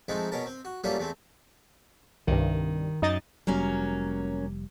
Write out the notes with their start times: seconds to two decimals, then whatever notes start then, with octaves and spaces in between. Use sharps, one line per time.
0.08 F3 G#3 A3 C4 D#4
0.32 B2 C#4 A#4 A5
0.46 C4
0.65 F#4
0.84 F#3 G3 A3 A#3 C#4 F4
0.98 E2 A3 C4
2.27 C2 G2 D#3
3.02 F#2 D#4 D#5 A6
3.47 F1 F#3 G3 A#3 C#4